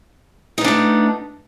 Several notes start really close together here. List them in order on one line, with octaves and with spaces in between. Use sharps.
D#4 B3 D4 A3